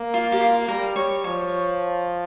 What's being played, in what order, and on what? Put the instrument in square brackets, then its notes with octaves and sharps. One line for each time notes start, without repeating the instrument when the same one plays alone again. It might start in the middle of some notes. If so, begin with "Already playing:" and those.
Already playing: [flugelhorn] A#3
[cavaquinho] F4
G4
F4
[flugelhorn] G3 [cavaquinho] A#4
[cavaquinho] C#5
[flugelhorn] F3 [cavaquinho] C#5